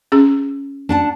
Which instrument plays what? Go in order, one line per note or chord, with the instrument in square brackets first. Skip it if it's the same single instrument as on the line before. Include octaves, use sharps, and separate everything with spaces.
[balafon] C#4 G#4
[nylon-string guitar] D4 F#5 A5